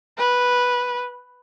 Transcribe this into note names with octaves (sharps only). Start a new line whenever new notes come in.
B4